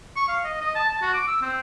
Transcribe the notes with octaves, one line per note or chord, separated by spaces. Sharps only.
C#6
F5
D#5
D#5
A5
A5
F#4
D6
E6
C4